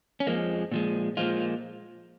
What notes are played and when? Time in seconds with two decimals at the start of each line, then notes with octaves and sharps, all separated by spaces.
0.20 C#4
0.27 F2 F3 G#3 A#3
0.71 A#2 F3 G#3
1.17 A#2 F3 G#3 F4